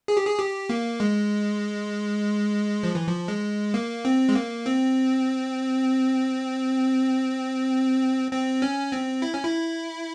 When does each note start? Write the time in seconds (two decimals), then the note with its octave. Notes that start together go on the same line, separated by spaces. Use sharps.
0.08 G#4
0.17 G4
0.26 G#4
0.39 G4
0.69 A#3
1.00 G#3
2.83 F3
2.95 E3
3.08 F3
3.28 G#3
3.74 A#3
4.05 C4
4.29 G#3
4.35 A#3
4.66 C4
8.31 C4
8.62 C#4
8.92 C4
9.22 E4
9.34 C#4
9.44 E4